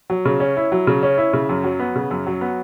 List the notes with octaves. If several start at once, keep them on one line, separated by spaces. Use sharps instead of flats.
F#3
C#3
C#4
E4
F#3
C#3
C#4
E4
C#3
F#2
F#3
B3
C#3
F#2
F#3
B3